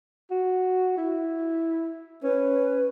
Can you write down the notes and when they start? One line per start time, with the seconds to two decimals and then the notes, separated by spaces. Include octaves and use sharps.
0.31 F#4
0.97 E4
2.23 C#4 B4